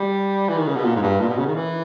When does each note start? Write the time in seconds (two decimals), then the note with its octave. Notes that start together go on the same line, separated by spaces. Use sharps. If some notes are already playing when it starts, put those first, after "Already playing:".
Already playing: G3
0.49 E3
0.58 D#3
0.67 C#3
0.75 B2
0.84 A#2
0.96 G#2
1.02 G2
1.20 A#2
1.29 B2
1.38 C#3
1.47 D#3
1.55 E3